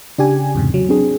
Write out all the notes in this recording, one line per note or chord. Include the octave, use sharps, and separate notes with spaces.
C#3 D4 G4 G#5
E2 G#2 C3
F#3
C4 D4 G#4